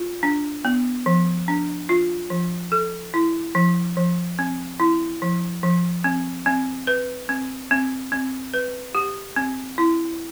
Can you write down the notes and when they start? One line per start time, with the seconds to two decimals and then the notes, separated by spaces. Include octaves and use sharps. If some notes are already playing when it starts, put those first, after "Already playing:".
Already playing: F4
0.23 D4
0.65 B3
1.06 F3
1.48 D4
1.89 F4
2.30 F3
2.72 A4
3.14 E4
3.55 F3
3.97 F3
4.39 C4
4.80 E4
5.22 F3
5.63 F3
6.04 C4
6.46 C4
6.87 B4
7.29 C4
7.71 C4
8.12 C4
8.54 B4
8.95 G4
9.36 C4
9.78 E4